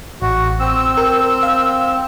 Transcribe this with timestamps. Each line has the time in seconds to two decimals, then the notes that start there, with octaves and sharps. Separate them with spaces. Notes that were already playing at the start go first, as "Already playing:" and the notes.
0.21 A1 F#4
0.60 C4 E6
0.97 A#4
1.43 F5